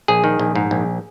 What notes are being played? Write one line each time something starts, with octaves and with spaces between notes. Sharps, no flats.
A#1 G#4
D#3
A#1
G#2
A#1